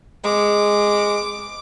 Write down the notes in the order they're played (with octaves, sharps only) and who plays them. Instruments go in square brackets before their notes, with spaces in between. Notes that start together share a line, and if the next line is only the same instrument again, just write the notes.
[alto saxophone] G#3 [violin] D6